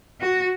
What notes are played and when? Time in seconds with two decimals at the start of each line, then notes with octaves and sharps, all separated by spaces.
0.21 F#4